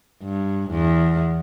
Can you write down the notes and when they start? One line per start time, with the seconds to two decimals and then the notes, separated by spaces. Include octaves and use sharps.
0.23 G2
0.70 E2